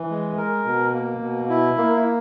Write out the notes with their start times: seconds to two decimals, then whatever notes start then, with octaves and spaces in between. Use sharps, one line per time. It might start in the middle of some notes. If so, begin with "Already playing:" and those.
Already playing: E3
0.10 G#3
0.38 A#4
0.66 B2
0.94 A#3
1.22 B2
1.49 E4
1.78 A#3